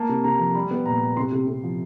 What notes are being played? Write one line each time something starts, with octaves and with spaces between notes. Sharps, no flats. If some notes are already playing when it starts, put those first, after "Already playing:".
Already playing: A#3 A5
C3
C3 A#5
F3
G3 B5
B3
A#2 A#5
A#2
C3 C6
C3
C3
F3